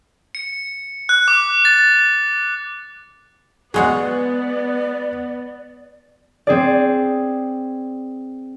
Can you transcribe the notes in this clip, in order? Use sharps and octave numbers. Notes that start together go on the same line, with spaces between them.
C#7
F#6
D6
A6
F#3 G#3 B3 F#4 G#4 D5 F#5
C4 G#4 D5